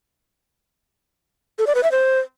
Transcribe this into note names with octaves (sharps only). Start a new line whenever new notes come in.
A4
D5
B4
E5
C5